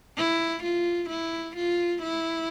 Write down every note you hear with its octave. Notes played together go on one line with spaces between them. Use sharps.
E4
F4
E4
F4
E4